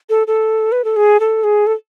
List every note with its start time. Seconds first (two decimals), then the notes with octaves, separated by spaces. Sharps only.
0.10 A4
0.27 A4
0.72 B4
0.84 A4
0.96 G#4
1.20 A4
1.44 G#4
1.67 A4